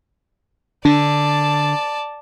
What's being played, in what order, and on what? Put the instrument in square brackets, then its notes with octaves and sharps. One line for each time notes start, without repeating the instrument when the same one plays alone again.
[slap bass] D3 [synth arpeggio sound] D4 [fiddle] D5 A5